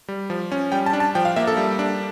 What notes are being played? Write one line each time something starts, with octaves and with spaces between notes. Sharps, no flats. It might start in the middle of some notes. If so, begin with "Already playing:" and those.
G3
F3
C#4
G3 G5
A5
D4
A5
F3 G5
F5
A#3 E5
A4
G3
D4